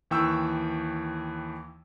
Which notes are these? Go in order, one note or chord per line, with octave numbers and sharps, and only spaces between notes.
D#2 E3 G5 C#6 E6